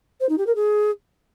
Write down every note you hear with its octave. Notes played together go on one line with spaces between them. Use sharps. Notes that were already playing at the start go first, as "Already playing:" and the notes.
C5
D#4
G4
A#4
G#4